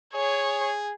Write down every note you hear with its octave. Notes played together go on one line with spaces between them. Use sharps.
G#4 C#5